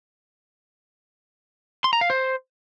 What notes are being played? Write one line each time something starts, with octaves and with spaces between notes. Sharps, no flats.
C6
A#5
F5
C5